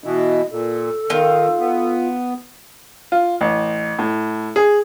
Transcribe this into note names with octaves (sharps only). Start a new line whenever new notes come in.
B2 E3 D#5
A#2 A4
D#3 D#4 F4 F5
B3
F4
A1
A2
G#4